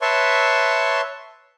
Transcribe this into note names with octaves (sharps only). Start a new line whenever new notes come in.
B4 C#5 E5 A5 C6 C#6